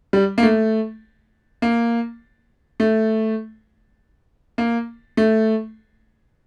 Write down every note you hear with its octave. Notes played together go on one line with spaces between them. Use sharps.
G3
A#3
A3
A#3
A3
A#3
A3